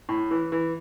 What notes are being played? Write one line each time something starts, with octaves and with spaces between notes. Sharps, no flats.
A2
E3
E3